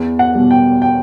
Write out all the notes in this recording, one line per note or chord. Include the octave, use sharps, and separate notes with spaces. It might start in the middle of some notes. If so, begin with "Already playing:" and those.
Already playing: E2
F#5
B2 G3
G5
G5